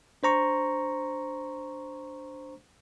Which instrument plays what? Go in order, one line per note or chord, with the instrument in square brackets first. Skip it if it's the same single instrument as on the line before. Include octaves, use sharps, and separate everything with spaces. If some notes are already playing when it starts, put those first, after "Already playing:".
[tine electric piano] D4 C5 A#5 C#6